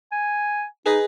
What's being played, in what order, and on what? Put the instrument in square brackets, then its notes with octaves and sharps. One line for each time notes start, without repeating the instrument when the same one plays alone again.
[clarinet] G#5
[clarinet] D#4 [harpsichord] G#4 B4 D#5